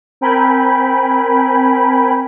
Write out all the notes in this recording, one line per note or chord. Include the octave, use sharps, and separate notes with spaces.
C4 A#4 G5 G#5 B5